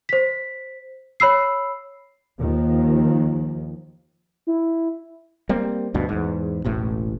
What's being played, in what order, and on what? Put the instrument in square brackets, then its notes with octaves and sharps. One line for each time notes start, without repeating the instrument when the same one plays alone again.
[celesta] C5 B6
C#5 B5 E6 C7
[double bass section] D#2 D#3 F3
[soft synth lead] E4
[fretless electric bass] G3 A#3 C4
D2 G2 B2
E2 G#2
E1 A1 A2